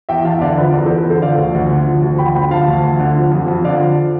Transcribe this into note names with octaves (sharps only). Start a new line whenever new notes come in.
E2 E5 G5
E2 F5 A5
E5
D3 D5 F5
F3 B4 D5
E2 B4 D5
A4 C5
E2
B4
D3 A4 C5
F3 D5 F5
D2
D2
D3
F3
D2
D2 G5 B5
D3 G5 B5
F3 F5 A5
D2
D2
D3
F3
F2
F2
D3 D5 F5
F3